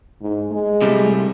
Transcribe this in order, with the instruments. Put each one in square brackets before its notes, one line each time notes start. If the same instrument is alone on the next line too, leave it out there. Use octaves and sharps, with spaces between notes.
[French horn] G#2
G#3
[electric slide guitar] C3 G3 A3